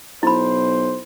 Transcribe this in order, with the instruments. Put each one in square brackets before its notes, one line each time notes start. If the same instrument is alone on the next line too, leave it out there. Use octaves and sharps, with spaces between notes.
[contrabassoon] B1 [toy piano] E4 B5 [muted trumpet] C5